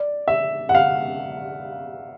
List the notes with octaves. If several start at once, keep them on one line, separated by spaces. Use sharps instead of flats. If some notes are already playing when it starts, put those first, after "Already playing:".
Already playing: D5
E5
F#5
F5